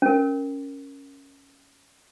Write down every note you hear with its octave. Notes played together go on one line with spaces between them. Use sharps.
C#4 A#4